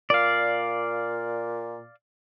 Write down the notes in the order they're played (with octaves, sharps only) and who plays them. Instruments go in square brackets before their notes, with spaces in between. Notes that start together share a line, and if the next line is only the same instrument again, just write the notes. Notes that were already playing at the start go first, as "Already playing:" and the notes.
[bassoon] A#2 [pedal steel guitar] D5 F5